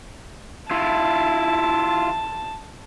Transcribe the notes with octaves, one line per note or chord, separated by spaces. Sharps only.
E4 F4 A5